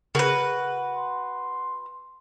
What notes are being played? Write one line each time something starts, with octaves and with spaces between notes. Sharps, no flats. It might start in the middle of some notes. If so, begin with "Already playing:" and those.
C#3 F#4 G#4 A#4 B4
C6